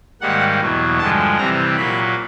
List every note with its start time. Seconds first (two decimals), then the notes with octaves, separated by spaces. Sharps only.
0.21 G#2 D#3 G3 A#3 F#5
0.61 E2 B2 F#3
0.99 G2 D3 F3 G#3 A5
1.37 C3 E3 G3 C4 A#5
1.76 A#2 F#3 A#3 B5